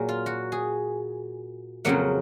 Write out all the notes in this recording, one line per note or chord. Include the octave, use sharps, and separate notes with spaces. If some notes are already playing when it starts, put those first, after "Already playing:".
Already playing: A#2 F#3 A#3 G#4
F4
F#4
G#4
F2 C#3 F#3 A#3 F#5